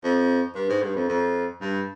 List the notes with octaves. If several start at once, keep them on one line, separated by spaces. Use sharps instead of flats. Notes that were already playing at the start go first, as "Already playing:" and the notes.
F2
G2
G#2
G2
F2
F2
G2